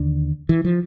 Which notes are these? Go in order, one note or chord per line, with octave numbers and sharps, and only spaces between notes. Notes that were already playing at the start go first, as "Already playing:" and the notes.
Already playing: D#2 D3
E3
F3